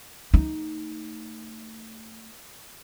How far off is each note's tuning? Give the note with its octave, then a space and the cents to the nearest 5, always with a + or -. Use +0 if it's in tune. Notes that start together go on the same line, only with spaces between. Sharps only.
A3 +25 D#4 +0